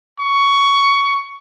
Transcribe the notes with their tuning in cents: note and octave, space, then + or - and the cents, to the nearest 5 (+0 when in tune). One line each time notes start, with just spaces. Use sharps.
C#6 +15